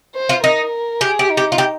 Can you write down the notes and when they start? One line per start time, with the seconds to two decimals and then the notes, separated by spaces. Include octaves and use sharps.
0.15 C5
0.29 F4
0.43 D#4 A#4
1.01 G4 G#4
1.19 G4
1.30 D#4
1.37 G4
1.52 F4
1.58 G4